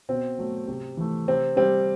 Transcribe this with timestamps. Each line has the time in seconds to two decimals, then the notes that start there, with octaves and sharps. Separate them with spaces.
0.09 B2 C4
0.39 F#3 A3
0.68 C3
0.97 E3 A3
1.28 C3 C4
1.57 G3 C4